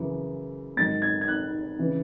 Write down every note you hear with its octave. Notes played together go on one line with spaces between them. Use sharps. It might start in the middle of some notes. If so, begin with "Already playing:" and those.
Already playing: F#2 C#3 E3
G#2 D#3 F#3 A6
G#6
G#6
F#6
C#3 E3